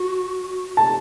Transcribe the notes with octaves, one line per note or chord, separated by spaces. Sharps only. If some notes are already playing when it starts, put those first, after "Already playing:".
Already playing: F#4
A5